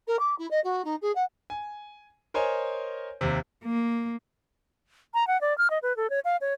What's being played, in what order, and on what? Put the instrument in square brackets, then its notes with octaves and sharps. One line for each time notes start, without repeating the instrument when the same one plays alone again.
[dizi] A#4
D6
E4
D#5
F#4
D#4
G#4
F#5
[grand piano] G#5
A#4 C5 C#5 D#5 G#5
D#2 C3
[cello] A#3
[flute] A#5
F#5
D5
F6
D#5
B4
A4
C#5
F5
C#5